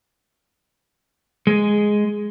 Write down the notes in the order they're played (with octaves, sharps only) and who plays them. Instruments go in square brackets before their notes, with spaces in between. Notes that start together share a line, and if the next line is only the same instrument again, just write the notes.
[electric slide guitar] G#3